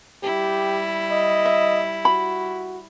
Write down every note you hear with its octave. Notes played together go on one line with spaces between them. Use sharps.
G3 E4 G4
D#5
E5
F#4 B5